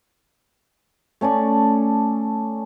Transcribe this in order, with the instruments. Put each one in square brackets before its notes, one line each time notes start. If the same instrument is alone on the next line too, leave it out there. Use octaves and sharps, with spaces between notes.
[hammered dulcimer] A3 C#4 A4 D5